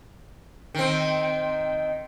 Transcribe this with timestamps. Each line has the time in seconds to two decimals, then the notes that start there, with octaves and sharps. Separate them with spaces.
0.75 D#3 C4